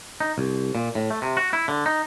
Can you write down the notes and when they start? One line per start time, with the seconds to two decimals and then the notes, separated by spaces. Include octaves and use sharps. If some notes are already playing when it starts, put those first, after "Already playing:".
0.20 D#4
0.38 C2
0.75 A#2
0.95 A2
1.10 A3
1.22 C3
1.37 F#4
1.53 E4
1.68 D3
1.86 D#4